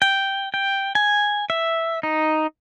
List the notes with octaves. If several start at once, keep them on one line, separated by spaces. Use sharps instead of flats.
G5
G5
G#5
E5
D#4